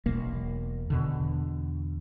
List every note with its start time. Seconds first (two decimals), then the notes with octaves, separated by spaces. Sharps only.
0.06 E1 B1 A#3
0.90 E2 B2 D3